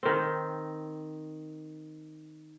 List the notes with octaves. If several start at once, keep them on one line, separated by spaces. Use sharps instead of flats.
D#3 C4